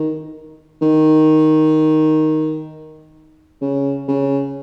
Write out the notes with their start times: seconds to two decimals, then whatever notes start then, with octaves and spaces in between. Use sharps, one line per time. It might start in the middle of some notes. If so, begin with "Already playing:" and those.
Already playing: D#3
0.81 D#3
3.61 C#3
4.08 C#3